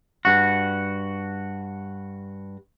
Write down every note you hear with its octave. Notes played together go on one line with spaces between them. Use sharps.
G2 F#4